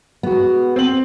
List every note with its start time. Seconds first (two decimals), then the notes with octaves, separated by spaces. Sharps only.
0.23 G#3 B3 F#4
0.76 C4 F#7